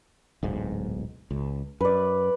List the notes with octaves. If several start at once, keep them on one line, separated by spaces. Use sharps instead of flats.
D1 B1 G#2
C#2
F#2 B4 D5